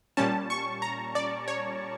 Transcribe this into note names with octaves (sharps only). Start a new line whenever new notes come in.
A#2 G3 C#4 A5
C#6
A#5
D5
C#5